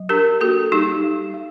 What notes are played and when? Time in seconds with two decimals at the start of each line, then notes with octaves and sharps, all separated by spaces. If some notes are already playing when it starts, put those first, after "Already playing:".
Already playing: F#3
0.09 D4 G4 A#4
0.41 A#3 F#4 A4
0.72 G3 D#4 G4
1.04 G3
1.34 G3